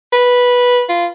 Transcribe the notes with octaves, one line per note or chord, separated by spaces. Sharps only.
B4
F4